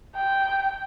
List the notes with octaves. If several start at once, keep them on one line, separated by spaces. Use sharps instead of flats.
G5